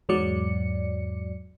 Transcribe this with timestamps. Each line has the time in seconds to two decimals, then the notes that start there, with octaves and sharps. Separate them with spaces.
0.09 E2 G#2 F#3 D5 C#7